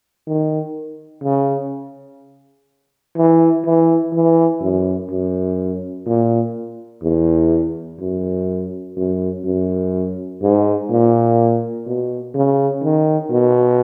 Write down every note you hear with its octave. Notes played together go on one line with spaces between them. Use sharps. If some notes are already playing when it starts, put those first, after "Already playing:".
D#3
C#3
E3
E3
E3
F#2
F#2
A#2
E2
F#2
F#2
F#2
G#2
A#2
B2
C#3
D#3
B2